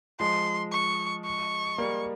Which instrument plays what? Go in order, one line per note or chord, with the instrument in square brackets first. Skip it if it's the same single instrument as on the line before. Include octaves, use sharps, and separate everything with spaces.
[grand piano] F3 G#3 [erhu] C6
[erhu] C#6
C#6
[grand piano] G3 A#3